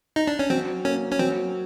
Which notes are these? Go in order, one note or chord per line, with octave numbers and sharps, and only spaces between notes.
D#4
D4
C#4
F#3 C4
A#3 C#4
C#4
F#3 C4